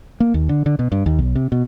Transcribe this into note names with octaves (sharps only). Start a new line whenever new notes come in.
A#3
D#2
D3
D3
B2
G2
D#2
B1
C3
B2